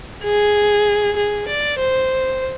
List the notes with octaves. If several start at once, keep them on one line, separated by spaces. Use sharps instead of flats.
G#4
G#4
D5
C5